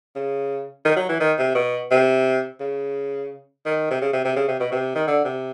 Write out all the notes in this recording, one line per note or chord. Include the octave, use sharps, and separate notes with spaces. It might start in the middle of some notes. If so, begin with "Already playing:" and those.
C#3
D#3
F#3
E3
D#3
C3
B2
C3
C#3
D#3
C3
C#3
C3
C3
C#3
C3
B2
C3
D#3
D3
C3